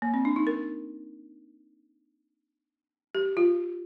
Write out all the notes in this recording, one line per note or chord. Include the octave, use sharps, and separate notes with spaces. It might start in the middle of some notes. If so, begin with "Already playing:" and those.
A#3
C4
D4
D#4
A#4
G4
F4